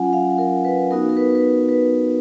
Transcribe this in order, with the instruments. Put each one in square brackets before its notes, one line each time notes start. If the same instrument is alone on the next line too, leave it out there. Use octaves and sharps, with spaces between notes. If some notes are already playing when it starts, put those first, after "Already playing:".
Already playing: [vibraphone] F#3 C#4 F4 F#5 G#5
F5
A#4
B4
B3 D#4 F#4 A#4
A#4
B4
B4
A#4
B4